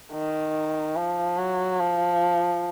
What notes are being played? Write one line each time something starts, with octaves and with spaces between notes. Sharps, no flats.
D#3
F3
F#3
F3